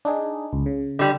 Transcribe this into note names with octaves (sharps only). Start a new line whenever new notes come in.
D4 D#4 G#4
C#2
C#3
D3 G3